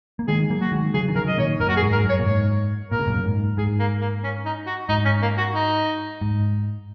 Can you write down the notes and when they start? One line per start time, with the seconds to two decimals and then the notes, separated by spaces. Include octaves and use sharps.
0.19 A#3
0.28 D#3 G#3 G#4
0.50 F#3 A#3
0.61 F#4
0.72 D#3 G#3
0.94 C#3 F#3 G#4
1.08 D#3
1.15 C#3 F#3 A#4
1.28 D#5
1.38 A#2 D#3 C#5
1.60 F#2 A#2 A#4
1.69 F#4
1.76 G#4
1.82 G#2
1.92 A#4
2.04 F#2
2.09 C#5
2.19 A#2
2.26 G#2 C#5
2.91 A#2 A#4
2.99 C#3
3.07 F#2 A#2
3.24 G#2
3.57 G#2 G#4
3.79 A#3
4.01 A#3
4.24 C#4
4.45 D#4
4.67 F#4
4.89 G#2 D#4
5.05 C#4
5.22 A#3
5.38 F#4
5.55 D#4
6.21 G#2